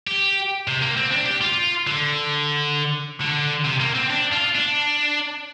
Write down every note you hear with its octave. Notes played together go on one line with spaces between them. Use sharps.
G4
C3
A#3
C4
D4
G4
F4
D3
D3
C3
A#3
C4
D4
F4
D4